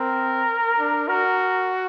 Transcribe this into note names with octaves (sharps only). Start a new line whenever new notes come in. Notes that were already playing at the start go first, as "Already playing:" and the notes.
Already playing: C4 A#4
D4
F#4 A#4